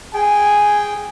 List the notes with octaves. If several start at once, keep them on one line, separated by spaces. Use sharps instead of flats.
G#4 G5 G#5